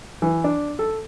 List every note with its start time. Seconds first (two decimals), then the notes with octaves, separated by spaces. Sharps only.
0.22 E3
0.44 D4
0.79 A4